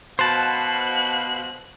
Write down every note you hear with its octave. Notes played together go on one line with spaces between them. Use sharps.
B2 C5 F5 A5 F#6